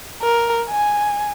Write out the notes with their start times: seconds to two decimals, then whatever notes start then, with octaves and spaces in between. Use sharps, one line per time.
0.22 A#4
0.70 G#5